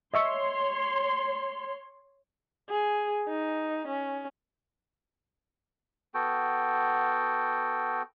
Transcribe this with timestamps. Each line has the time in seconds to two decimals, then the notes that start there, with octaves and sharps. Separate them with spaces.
0.14 C#5 D#5 E5 C6 C#6
2.70 G#4
3.29 D#4
3.88 C#4
6.14 B3 F#4 A4 G5